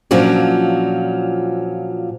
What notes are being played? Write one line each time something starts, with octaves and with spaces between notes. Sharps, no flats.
A#2 F3 F#3 C#4 D4